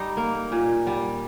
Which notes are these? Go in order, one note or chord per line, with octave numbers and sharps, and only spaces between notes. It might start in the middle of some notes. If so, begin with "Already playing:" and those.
Already playing: G3 D#4
A#3
A#2
G3